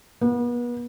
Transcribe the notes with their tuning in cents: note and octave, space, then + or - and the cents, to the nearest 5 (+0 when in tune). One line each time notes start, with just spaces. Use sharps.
B3 -35